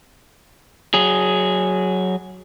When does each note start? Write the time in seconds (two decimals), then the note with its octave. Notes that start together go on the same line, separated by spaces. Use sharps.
0.94 F#3 G#4